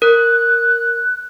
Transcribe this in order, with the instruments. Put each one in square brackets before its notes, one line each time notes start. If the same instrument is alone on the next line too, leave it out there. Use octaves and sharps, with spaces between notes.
[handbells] A#4 [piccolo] F#6